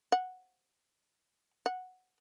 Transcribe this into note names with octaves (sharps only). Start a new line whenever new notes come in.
F#5
F#5